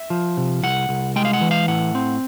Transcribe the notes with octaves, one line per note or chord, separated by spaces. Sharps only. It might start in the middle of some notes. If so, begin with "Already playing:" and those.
Already playing: E5
F3
C3
C2 F#5
C2
G#3 G5
F5
F#5
E3
F5
A2 F#5
C4